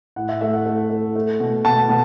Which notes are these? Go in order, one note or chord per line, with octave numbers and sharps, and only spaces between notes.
A2 F#5
E5
A3 E5
F#5
A3
A3
A3
B2
B2 A5
B2